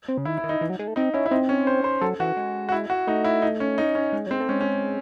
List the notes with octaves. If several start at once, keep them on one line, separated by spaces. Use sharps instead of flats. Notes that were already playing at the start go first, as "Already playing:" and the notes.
C4
C#3
D#3 E4
E4
D#3
D#4
E3
F#3
G#3
A3
C4 D#4
C#4 E4
E4
C4 D#4
C#4
C5
C5
F#3 A4
E3 F#4
G#3
F#4
E4
F#4
A3 D#4
E4
D#4
C#4
D#4
C#4
G#3
F#3
G#3 C4
A3
G#3 C#4
C#4